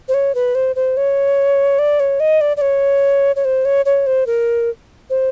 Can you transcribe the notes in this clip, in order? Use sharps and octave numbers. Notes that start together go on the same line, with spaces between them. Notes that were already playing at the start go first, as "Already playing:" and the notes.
C5
C#5
B4
C5
C5
C#5
D5
C#5
D#5
D5
D5
C#5
C#5
C5
C#5
C#5
C5
A#4
C5